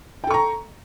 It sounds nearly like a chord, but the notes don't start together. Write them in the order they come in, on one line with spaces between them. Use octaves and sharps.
G5 A4 C#6 A#5